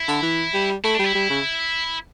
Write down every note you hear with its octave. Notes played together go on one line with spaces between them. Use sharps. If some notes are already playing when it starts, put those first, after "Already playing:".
Already playing: E4
D3
E3
G3
A3 E4
D4
G3 E4
G3
C#3